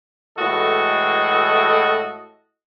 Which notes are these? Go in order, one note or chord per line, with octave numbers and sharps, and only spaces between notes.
A2 E3 G#3 F#4 A4 D#5